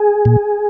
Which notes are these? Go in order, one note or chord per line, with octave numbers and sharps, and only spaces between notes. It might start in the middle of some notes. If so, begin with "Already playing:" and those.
Already playing: G#4
A#2